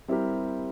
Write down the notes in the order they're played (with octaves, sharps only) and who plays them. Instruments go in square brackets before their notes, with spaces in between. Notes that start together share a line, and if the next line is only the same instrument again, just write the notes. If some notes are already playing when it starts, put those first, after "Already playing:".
[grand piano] G3 C4 E4 G4 A#4